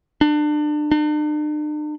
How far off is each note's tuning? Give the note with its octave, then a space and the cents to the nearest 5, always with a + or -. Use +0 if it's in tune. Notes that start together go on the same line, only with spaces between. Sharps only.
D4 +30
D4 +45